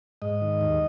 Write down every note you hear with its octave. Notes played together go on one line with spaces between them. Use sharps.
G#2 D#5
D#3
D#2